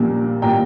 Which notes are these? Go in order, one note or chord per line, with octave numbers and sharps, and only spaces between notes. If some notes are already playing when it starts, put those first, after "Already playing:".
Already playing: A#1 A#2 G3 A#3
A#2 G3 A#3 G5 A#5